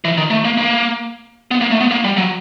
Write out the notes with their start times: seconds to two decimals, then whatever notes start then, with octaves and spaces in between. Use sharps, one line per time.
0.05 E3
0.18 D#3
0.30 A3
0.45 A#3
0.58 A#3
1.51 B3
1.61 A#3
1.71 A3
1.81 B3
1.91 A#3
2.04 G3
2.17 F#3